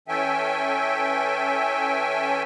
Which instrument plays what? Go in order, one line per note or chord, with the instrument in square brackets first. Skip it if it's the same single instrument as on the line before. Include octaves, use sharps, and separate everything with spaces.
[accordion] E3 C#4 A4 E5 G5 G#5